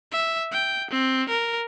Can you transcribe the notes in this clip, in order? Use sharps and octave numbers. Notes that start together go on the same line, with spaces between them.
E5
G5
C4
A#4